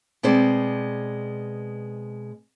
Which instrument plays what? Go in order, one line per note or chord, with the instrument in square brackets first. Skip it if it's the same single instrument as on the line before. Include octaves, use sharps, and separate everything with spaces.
[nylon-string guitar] B2 G#3 C4 C5 D5